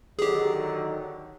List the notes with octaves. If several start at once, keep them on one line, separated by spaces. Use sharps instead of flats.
D3 D#3 F#3 G4 G#4